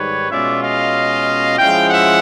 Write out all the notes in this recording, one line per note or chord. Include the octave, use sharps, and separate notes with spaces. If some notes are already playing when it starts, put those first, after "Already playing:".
Already playing: G#2 D#3 G3 B4 C#5
B2 G#3 C#4 F4 D5 E5
D#5 F5
F3 G#3 C#4 E4 F5 G5
E5 F#5